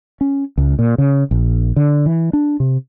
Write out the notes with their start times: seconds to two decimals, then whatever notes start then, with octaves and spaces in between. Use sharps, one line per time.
0.21 C#4
0.58 C#2
0.79 A#2
0.98 C#3
1.31 A#1
1.76 D3
2.06 E3
2.33 D4
2.60 C3